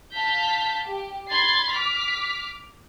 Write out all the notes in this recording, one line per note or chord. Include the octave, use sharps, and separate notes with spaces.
F5 A5 G6 B6
G4
B5 C6 G#6 A6 C7
D6 F6 B6